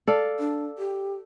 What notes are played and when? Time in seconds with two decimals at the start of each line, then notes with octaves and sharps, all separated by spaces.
0.07 A4 D5 F5
0.39 D4
0.78 G4